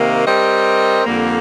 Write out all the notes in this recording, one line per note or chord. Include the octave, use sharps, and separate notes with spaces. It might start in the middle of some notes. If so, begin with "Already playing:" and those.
Already playing: C3 D#3 A#3
G3 C4 G4 A#4 D#5
F2 D3 G3 A#3